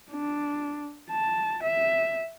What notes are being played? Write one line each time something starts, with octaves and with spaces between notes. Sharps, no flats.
D4
A5
E5